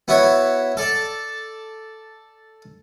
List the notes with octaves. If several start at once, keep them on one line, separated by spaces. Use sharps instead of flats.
B3 E4 F#4 C#5 E5
A4 D5 A5